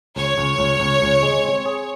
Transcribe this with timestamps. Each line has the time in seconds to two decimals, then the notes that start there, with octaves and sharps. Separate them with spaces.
0.16 C#2 C#5
0.38 C#2
0.59 C#2
0.80 C#2
1.02 C#2
1.23 G#3
1.44 C4
1.66 G#4